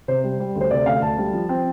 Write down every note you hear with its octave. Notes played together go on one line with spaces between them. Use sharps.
C3 C5
G3
G3
D2
C5
C3 D5
D2 F5
D2 A5
G3
F3
C4